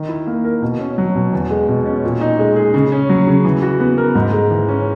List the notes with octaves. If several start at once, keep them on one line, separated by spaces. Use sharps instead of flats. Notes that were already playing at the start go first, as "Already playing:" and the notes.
Already playing: D#3
E4
A#3
A#4
B2
C#4
F#3
B2
E2
G#3
B2
C#4
A#2
D#4
G#3
G#4
C#3
C#4
F#3
C#3
E3
F#4
B3
A#4
G#2
G#3
E3
C#4